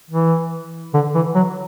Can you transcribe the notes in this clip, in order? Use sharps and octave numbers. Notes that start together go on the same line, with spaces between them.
E3
D3
E3
F#3